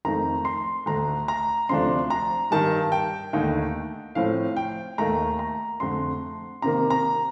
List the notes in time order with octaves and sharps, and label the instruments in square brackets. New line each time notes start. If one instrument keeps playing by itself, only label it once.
[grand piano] F2 D#3 A3 D#4 A#5
C6
D2 D3 A3 A#5
A#5
D2 C3 F3 A3 D4 C6
A#5
G2 D#3 G3 A5
G5
D#2 D3 A3 D#4
A2 F3 A3 C4 F5
G5
D#2 D#3 A3 A#5
A#5
F2 D3 A3 C6
C3 D#3 A#3 A#5
A#5